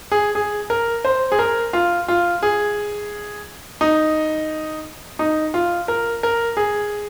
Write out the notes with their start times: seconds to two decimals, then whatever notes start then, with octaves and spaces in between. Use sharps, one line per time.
0.12 G#4
0.35 G#4
0.70 A#4
1.05 C5
1.32 G#4
1.39 A#4
1.73 F4
2.08 F4
2.43 G#4
3.81 D#4
5.19 D#4
5.54 F4
5.88 A#4
6.23 A#4
6.57 G#4